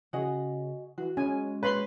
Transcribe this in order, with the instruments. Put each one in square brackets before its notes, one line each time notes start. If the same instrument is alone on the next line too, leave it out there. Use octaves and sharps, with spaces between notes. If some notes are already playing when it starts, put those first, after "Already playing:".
[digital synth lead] C#3 [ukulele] F#4 G#4 D#5
[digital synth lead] E3 [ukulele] F#4
[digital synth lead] G#3 [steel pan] C#4 G#5
[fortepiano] B4 [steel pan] C#5 B5 C6